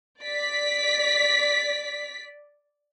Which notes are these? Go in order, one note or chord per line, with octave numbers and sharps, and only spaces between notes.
D5 B6